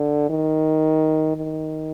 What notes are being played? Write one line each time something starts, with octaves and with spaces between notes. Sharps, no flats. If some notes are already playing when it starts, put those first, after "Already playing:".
Already playing: D3
D#3
D#3